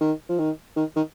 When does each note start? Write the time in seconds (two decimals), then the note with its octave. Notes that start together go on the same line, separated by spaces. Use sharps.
0.01 D#3
0.29 F3
0.39 D#3
0.76 D#3
0.96 D#3